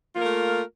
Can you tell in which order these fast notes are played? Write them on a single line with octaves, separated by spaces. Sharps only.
F4 A#3 A#4 A3